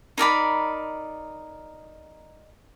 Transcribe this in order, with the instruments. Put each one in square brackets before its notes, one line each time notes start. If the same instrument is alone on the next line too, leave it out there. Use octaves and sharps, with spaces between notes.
[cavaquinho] D#4 A#4 D5 B5